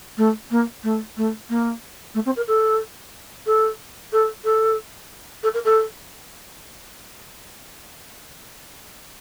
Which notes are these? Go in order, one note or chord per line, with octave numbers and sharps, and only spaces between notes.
A3
A#3
A3
A3
A#3
A3
C4
A#4
A4
A4
A4
A4
A4
A#4
A4